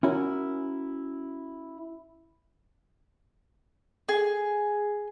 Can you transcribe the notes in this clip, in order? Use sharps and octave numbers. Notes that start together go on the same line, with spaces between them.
C#4 E4 F#4 A#4
G#4